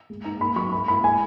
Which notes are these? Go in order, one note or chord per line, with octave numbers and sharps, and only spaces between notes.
G#3
D#4 A#5
A#3 B5
F#3 C#6
G#3 B5
E4 B5
G#3 G#5